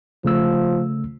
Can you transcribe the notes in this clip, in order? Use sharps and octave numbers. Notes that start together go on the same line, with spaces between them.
C#3 F3 A3 E6